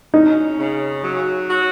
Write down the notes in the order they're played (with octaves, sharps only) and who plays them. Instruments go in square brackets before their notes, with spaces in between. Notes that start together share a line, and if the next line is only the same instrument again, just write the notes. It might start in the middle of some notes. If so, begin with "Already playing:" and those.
[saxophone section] C#4 [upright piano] D#4
[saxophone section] C#3
F#3
F#4